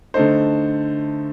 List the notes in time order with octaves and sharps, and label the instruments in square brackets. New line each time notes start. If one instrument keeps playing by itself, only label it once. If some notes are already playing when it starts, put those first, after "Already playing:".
[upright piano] D3 A3 D#4 C5